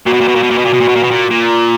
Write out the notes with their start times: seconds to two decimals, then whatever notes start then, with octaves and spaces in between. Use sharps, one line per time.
0.06 A#2 F#4
0.13 B2
0.21 A#2
0.28 B2
0.36 A#2
0.43 B2
0.51 A#2
0.58 B2
0.65 A#2
0.74 B2
0.80 A#2
0.88 B2
0.95 A#2
1.03 B2
1.10 A#2
1.30 A#2 F4